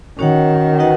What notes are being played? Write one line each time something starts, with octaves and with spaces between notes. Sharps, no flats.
D#3 C#4 F#4 C#5 F#5
D#4 F#4 B4 D#5 F#5